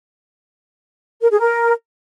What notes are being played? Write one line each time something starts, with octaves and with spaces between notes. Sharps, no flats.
A#4
G#4
A#4